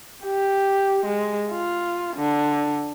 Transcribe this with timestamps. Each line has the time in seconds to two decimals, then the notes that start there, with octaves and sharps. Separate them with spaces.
0.25 G4
1.05 G#3
1.51 F4
2.17 D3